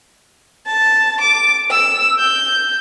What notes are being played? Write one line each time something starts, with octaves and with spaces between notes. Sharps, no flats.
A5
D6
E6
G6